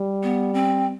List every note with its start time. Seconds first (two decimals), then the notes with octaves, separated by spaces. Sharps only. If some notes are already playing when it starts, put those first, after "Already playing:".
Already playing: G3
0.23 B3
0.54 C4